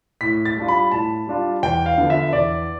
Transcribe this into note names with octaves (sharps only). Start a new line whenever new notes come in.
A2 B6
A6
G3 D4 F4
B5
A2 A5
G3 D4 F4
E2 G5
F5
D3 F3 B3
E5
E2 D5